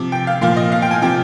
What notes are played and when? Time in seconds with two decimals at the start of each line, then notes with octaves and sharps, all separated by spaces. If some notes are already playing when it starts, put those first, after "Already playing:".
Already playing: C3 F3
0.12 G5
0.27 F5
0.41 A#2 F3 F5
0.57 D#5
0.72 F5
0.82 G5
0.91 G#5
1.02 C3 F3 G5